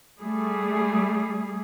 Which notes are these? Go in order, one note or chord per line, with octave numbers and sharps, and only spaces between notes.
G3 A3 G#4